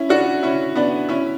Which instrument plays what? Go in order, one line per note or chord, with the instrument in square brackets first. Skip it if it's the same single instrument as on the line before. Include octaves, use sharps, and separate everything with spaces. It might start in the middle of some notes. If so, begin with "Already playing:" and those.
Already playing: [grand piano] C#4 E4
D4 F#4
C#4 E4
B3 D4
C#4 E4